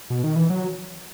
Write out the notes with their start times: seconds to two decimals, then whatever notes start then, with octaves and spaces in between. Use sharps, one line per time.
0.10 B2
0.24 D#3
0.36 E3
0.50 F#3